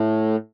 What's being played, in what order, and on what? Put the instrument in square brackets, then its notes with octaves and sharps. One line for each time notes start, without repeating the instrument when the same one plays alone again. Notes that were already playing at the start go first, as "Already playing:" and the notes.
Already playing: [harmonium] A2